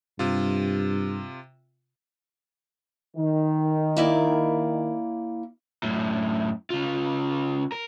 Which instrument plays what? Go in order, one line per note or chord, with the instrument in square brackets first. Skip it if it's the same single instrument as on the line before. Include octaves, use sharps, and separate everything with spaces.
[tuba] G2 [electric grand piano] C3 F4
[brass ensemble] D#3
[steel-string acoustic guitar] A#3 E4 D5
[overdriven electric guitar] F#2 A2
C#3 F4
A#4